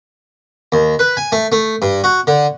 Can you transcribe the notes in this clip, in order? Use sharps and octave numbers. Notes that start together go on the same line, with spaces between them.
D#2
B4
G#5
A3
A3
G2
F#4
D3